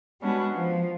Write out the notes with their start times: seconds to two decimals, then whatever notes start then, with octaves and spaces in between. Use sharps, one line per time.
0.21 G3 G#3 B3 C#4 D4 F#4
0.53 F3